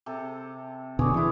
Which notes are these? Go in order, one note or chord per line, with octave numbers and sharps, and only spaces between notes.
C3 A4
F1 B2 D3 G#4 C#5 D5
E3 E4 D#5